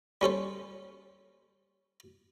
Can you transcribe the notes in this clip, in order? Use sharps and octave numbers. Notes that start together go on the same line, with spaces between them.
G3 C#4 A4 C5